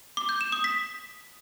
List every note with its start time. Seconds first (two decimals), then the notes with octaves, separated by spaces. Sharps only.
0.17 D6
0.29 G6
0.41 E7
0.52 D#6
0.64 B6